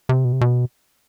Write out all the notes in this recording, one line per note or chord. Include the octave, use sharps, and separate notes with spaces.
C3
B2
C3
B2